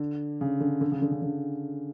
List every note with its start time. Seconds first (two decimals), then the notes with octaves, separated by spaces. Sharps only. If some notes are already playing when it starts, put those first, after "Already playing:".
Already playing: D3
0.41 C#3
0.60 D3
0.81 D3
0.92 C#3
1.02 D3
1.11 C#3
1.22 D3